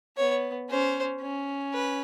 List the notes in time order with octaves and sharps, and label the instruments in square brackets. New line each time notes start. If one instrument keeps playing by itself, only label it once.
[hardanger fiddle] B3 [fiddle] C#5
[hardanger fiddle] C#4 [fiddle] C5
[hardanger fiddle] C#4
[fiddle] B4